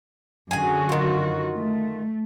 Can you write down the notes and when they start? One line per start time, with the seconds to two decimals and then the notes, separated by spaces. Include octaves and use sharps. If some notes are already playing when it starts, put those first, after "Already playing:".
0.51 F#2 D3 F#4 G#4 G#5
0.89 D#3 F4
1.57 A3